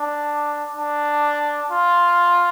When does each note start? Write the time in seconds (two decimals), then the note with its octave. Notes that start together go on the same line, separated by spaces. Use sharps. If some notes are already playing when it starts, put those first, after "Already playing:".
Already playing: D4
0.76 D4
1.71 F4